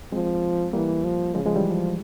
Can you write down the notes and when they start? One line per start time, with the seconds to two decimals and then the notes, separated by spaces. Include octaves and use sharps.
0.12 F3 G#3 C4
0.73 E3 G3 A#3
1.04 F3
1.35 C#3 F3 G#3
1.46 F3 G#3
1.55 E3 G3
1.66 F3